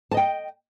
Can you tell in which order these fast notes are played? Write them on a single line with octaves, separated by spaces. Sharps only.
A5 D#5 G5